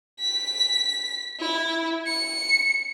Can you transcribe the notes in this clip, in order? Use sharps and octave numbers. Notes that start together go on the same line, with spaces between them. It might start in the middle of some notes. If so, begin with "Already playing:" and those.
B6
E4
C#7